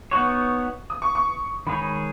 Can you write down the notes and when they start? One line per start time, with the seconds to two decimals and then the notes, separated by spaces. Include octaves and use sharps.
0.11 B3 D#4 F#4 C#5 C#6
0.90 D#6
1.02 C#6
1.15 C#6
1.67 D#3 G#3 D#4 G#4 C#5 B5